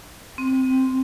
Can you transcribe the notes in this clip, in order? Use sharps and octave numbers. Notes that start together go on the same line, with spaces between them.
C4